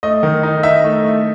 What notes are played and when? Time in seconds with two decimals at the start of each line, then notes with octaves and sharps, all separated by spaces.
0.03 A3 D#5
0.23 D#3
0.43 D#4
0.63 D#4 E5
0.84 A3
1.04 A3